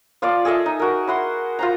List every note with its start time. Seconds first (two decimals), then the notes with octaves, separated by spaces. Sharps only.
0.22 F3 F4 D5 F5
0.45 G#4 A4 D#5 E5
0.66 D#4
0.80 F#4 A#4
1.07 E4 F#5 C6
1.59 F4 C5 A#5